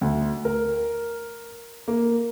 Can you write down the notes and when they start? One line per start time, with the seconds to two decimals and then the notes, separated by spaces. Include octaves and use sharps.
0.01 D2
0.45 A#4
1.88 A#3